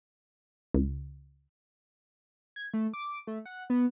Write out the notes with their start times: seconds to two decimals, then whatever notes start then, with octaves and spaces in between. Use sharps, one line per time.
0.74 C#2
2.56 G#6
2.74 A3
2.94 D6
3.27 A3
3.46 F#5
3.70 B3